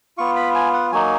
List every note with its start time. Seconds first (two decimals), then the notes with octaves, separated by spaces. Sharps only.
0.18 B3 F4 C#6
0.36 B5
0.55 G#5
0.74 F#5
0.92 F#3 A#3 D#4 G#5